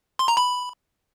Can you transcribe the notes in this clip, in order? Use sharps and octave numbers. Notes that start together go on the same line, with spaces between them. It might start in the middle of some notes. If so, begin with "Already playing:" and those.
C6
A#5
B5